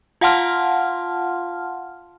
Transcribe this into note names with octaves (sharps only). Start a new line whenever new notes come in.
F4 F5 F#5 A5 C6 F6